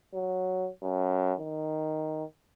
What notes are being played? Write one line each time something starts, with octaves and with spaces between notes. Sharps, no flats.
F#3
F#2
D#3